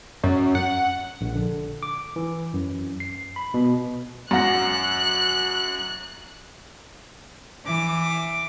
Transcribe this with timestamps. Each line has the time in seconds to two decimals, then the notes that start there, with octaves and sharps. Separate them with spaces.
0.24 F#2
0.55 F#5
1.21 A#1
1.35 D3
1.83 D6
2.16 E3
2.54 F#2
3.00 C7
3.36 B5
3.54 B2
4.31 F#2 F#5 F#6 A#6
7.66 E3 D6